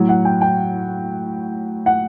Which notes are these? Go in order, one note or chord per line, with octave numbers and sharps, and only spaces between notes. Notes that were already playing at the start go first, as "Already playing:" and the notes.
Already playing: A2 F#3
F#5
G5
G5
F#5